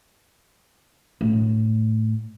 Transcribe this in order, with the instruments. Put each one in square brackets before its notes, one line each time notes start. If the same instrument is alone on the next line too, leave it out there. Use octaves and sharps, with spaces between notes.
[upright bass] A2